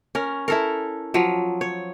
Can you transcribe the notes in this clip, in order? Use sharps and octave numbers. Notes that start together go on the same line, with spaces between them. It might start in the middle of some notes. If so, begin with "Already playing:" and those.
C#4 A#4
E4 A4 A#4
F3 F#3
C#5